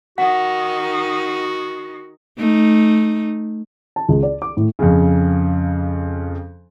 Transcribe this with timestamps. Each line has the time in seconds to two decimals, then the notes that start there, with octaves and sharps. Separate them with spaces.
0.18 D#3 D#4 F#4 F#5
2.39 A3 D#4
3.96 A5
4.09 C#2
4.23 D5
4.42 D6
4.57 A2
4.79 F2 C#3